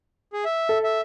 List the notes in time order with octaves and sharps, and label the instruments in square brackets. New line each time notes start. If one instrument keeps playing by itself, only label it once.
[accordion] G#4
E5
[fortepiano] A4
[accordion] E5